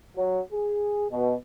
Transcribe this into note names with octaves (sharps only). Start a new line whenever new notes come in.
F#3
G#4
B2